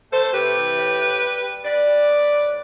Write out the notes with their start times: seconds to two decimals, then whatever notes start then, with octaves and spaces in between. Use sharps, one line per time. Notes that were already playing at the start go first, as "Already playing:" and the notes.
0.12 A3 A4 C5
0.24 C5
0.33 C3 G4 B4
0.55 E3
0.77 A2
0.99 A2
1.20 G3
1.43 G3
1.65 G3 B4 D5
1.87 G3
2.09 B3
2.31 A2